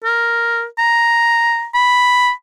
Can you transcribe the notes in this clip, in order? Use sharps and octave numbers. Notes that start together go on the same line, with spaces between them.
A#4
A#5
B5